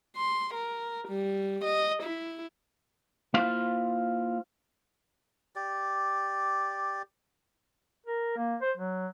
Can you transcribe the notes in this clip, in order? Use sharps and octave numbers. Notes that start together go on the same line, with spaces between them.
C6
A#4
G3
D#5
E4
A#3 E4 F4 C5 F5
G4 D5
A#4
A#3
C5
F#3